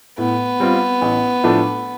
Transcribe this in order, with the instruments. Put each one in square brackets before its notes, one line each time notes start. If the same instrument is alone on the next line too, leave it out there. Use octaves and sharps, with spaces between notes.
[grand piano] A2 [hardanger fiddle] B3
[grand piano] G3 C4 F4
A1
A2 F3 A3 D4